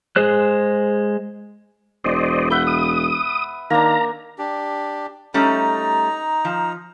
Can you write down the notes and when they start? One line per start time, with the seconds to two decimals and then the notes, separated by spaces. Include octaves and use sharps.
0.16 G#3 G#4 C5 F#6
2.04 E1 C5 D5 D#5
2.51 B4 E5 F#5 G6
2.67 D#6
3.70 D#3 A#3 D4 A#5
4.38 D4 G4
5.34 G3 A3 C#4 D#4 A#5
6.45 F3